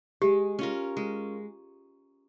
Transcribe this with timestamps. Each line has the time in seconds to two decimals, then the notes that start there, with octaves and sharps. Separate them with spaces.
0.22 G#3 G4
0.59 C#4 F4 A#4
0.97 G#3